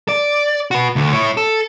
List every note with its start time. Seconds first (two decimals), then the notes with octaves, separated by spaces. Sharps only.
0.08 D5
0.71 F#4 B4
0.96 D2
1.13 E4 C#5
1.37 A4